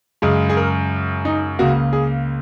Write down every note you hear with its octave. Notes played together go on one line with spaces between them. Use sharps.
F#2 C#3 G#3 G#4
G#4
A#4
D#4
C#2 C#3 A#3 F#4
G#4